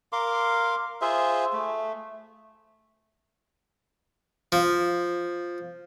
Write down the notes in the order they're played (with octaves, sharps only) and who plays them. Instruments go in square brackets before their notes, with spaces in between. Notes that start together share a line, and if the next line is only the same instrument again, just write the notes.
[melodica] A#4 F5 C6 D6
F4 G#4 C5 E5
A3
[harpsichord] F3